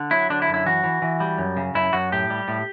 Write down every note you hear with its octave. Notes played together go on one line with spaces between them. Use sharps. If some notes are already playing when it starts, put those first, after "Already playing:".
Already playing: D3
F#3 E4
D3 D4
E4
F#2
E4
E3 F#4
E3
E3
G3
F#2
C#3
F#2 E4
F#2 F#4
A2 G4
G3
A2